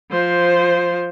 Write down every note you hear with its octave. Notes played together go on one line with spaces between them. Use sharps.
F3 C5